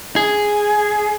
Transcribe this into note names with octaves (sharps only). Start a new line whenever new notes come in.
G#4